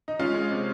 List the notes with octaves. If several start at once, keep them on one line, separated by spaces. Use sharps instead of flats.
D#4
G#3 C#4 F4
G#3
C3